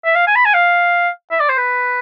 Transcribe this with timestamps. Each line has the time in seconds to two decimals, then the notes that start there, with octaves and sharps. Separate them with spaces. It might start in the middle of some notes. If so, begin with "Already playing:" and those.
0.05 E5
0.15 F5
0.27 G#5
0.36 B5
0.46 G#5
0.54 F5
1.31 E5
1.40 D5
1.49 C5
1.58 B4